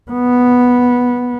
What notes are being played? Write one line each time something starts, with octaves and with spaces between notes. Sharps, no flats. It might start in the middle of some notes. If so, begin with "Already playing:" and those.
B3